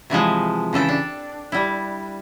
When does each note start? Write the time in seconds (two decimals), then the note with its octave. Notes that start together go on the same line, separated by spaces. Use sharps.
0.10 C3 E3 F3 G#3
0.73 C#3 E3 A4 G5
0.88 D4
1.52 G3 E4